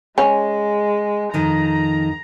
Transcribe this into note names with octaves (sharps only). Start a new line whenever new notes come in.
G#3 C#4
F2 D#3 A#5